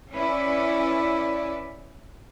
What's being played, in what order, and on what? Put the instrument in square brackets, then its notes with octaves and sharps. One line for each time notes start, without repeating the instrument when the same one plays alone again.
[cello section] C#4 E4 B4 D5